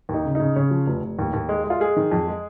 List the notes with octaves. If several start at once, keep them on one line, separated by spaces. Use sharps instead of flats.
D#2
D#4
C#3
C#3 D#4
C#3 C#5
F3
F1
F1
D#2
D#2
G#3
G#3
F4
G#3 G#4
D#3
F2
G#3